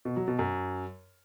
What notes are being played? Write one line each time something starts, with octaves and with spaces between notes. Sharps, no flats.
B2
F#3
B2
F#2